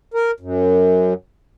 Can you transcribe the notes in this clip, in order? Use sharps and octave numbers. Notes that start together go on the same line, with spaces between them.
A#4
F#2